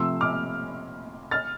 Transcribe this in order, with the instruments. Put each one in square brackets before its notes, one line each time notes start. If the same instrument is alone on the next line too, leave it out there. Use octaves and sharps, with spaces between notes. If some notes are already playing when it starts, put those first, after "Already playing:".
Already playing: [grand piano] C3 F3 A3 [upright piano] C6 E6
[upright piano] D6 F6
F6 A6